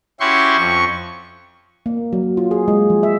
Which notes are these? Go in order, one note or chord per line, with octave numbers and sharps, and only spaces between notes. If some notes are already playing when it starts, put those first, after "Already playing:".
C#4 E4 F#4 G4 C6 C#6
F2 C#6
A#3
F#3
F4
G#4
G#3
F3
E5